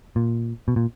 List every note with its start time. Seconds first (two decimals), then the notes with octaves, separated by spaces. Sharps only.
0.16 A#2
0.68 B2
0.76 A#2